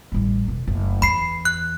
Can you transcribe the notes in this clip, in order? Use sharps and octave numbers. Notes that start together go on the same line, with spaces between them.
A1 G3
E1
F#1 A3
E2 B5 C7
F#6